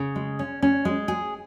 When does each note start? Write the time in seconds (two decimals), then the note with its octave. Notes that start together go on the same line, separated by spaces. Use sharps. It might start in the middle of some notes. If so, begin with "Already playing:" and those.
Already playing: C#3
0.16 G#3
0.39 C#4
0.62 C#4
0.85 G#3
1.08 G#4